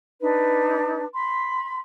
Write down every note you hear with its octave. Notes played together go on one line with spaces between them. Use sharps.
D4 D#4 B4
B5 C6